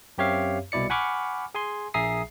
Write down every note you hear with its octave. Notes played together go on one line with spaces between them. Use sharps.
F#2 C4 G4 C#5 E5 F5
C2 B2 E4 D5 C#7
F#5 G#5 B5 C#6 D6 F6
G#4 G#5 C6
A#1 G#4 E5 A#5 D#6 C7